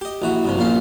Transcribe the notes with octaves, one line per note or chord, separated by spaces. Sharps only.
G4 D#5
A#1 E3 F#4
G2 C3 F3
A#1 A#2 F3 C#4 F5